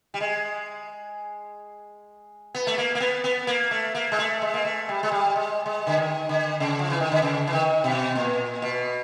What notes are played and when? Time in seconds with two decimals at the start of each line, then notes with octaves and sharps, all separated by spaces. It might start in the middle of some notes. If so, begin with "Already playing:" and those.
0.14 G3
0.20 G#3
2.55 B3
2.67 A3
2.78 A#3
2.95 A#3
3.00 B3
3.24 B3
3.47 A#3
3.71 A3
3.95 A#3
4.12 G#3
4.19 A3
4.42 G#3
4.54 A#3
4.65 A3
4.89 G3
5.03 G#3
5.12 G3
5.36 G#3
5.66 G#3
5.87 D3
5.97 D#3
6.29 D3
6.60 C#3
6.79 F3
6.90 E3
7.00 D#3
7.12 D3
7.22 C#3
7.47 E3
7.53 D#3
7.84 B2
8.15 A#2
8.62 B2